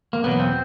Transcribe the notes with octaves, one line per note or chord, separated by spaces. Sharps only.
A#3
E2 B2 F#3 B3
C4